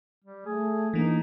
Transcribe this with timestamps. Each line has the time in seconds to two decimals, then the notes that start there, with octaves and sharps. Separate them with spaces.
0.24 G3
0.46 A3 G#4
0.93 E3 A#3 D4 D#4